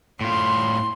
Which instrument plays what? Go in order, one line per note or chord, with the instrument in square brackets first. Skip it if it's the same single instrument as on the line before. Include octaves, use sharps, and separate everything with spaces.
[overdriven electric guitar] A2 F4 [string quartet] C6